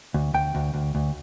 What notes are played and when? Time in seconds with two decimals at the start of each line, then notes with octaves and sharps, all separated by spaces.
0.14 D2
0.34 D2 G5
0.55 D2
0.74 D2
0.95 D2